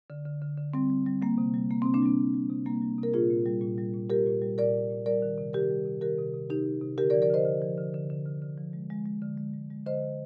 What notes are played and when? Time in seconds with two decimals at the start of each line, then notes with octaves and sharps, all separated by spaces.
0.10 D3
0.25 D3
0.42 D3
0.58 D3
0.74 G3 C4
0.90 G3
1.06 G3
1.22 G3 A#3
1.38 C3
1.54 G3
1.70 G3 A#3
1.82 C4
1.85 C3
1.94 A#3 D4
2.02 G3 C4
2.18 C3
2.34 G3
2.50 C3
2.66 G3 A#3
2.82 G3
2.98 C3
3.03 A#4
3.13 A#2 F4 G#4
3.30 A#2
3.46 G3
3.61 A#2
3.78 G3
3.94 A#2
4.10 G3 G4 A#4
4.26 A#2
4.42 G3
4.58 A#2 A#4 D5
4.75 A#2
4.90 A#2
5.06 G3 A#4 D5
5.22 D#3
5.38 C3
5.53 D#3 G4 A#4
5.71 G3
5.86 C3
6.01 D#3 G4 A#4
6.18 C3
6.34 C3
6.50 C3 D#4 G4
6.66 C3
6.81 C3
6.98 D3 G4 A#4
7.10 A#4 D5
7.14 F3
7.22 A#4 D5
7.30 D3 C5 D#5
7.45 D3
7.62 F3
7.78 D3
7.94 D3
8.10 D3
8.26 D3
8.42 D3
8.58 F3
8.73 G#3
8.90 G#3
9.06 G#3
9.22 D3
9.37 G#3
9.53 G#3
9.70 G#3
9.86 D3 C5 D#5
10.02 D3